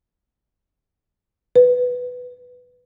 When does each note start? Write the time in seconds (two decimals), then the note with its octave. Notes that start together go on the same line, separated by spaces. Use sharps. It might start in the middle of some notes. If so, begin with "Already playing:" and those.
1.56 B4